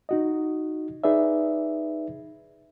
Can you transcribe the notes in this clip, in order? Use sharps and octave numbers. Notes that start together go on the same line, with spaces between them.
D#4 F#4 D#5
D#4 G#4 B4 D5 E5